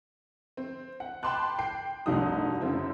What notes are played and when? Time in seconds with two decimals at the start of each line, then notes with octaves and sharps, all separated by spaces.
0.57 C4
1.00 F#5
1.23 G5 A5 B5 C6 D6 F#6
1.59 G5 C7
2.06 F1 C2 G2 D#4 F#4 D#6
2.61 F#2 C#3 C4 E4